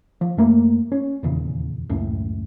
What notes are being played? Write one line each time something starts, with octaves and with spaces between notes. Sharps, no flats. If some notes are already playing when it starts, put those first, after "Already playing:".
F3
F#2 A3 A#3
C#4
D#1 E2 C#3
C#2 F#2 A2